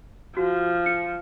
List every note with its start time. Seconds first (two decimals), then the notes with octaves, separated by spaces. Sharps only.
0.37 F3 F#4
0.86 C#7